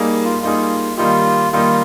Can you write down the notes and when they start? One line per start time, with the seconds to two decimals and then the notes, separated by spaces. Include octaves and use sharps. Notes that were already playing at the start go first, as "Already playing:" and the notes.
Already playing: G3 A#3 D#4 G#4
0.25 F4
0.43 G3 A#3 D#4 F4 G#4
0.98 D#3 G3 A#3 D#4 F4 G4
1.53 D#3 G3 A#3 D#4 F4 G4